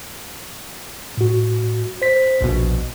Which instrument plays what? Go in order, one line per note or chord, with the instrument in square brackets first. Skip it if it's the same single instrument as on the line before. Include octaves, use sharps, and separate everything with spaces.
[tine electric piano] A2 F#4
C5 B6
[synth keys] A#1 B2 [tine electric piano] D#2